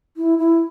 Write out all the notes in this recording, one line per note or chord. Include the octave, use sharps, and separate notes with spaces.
E4
E4